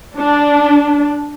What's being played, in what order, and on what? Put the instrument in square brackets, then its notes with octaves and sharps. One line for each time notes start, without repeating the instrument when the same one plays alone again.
[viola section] D4